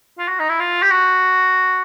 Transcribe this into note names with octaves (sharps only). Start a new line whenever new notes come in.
F4
F#4
D#4
E4
F4
G4
F#4